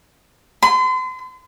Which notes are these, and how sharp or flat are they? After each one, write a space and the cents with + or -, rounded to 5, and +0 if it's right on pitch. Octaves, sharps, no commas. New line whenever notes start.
C6 -40